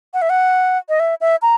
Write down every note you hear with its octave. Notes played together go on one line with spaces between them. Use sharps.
F#5
E5
F#5
D#5
E5
E5
A#5